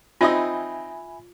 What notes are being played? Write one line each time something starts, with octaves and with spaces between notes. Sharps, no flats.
C4 D#4 F4 D#5 E5 G#5 B5